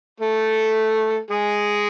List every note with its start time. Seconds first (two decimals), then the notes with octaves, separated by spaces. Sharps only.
0.21 A3 A4
1.30 G#3 G#4